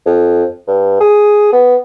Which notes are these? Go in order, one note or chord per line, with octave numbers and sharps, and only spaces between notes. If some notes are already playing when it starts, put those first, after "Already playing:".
F2
G2
G#4
B3